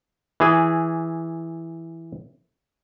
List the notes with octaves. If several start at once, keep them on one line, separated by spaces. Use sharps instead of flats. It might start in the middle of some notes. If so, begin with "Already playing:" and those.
E3 G#4